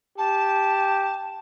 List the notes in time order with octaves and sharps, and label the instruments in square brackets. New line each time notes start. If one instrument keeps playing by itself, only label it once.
[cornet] G4 [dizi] A5